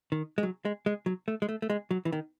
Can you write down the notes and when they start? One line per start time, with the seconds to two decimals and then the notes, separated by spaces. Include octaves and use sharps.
0.12 D#3
0.38 G#3
0.43 F#3
0.65 G#3
0.86 G#3
1.06 F#3
1.28 A3
1.42 G#3
1.49 A3
1.62 A3
1.70 G#3
1.91 F#3
2.05 E3
2.12 D#3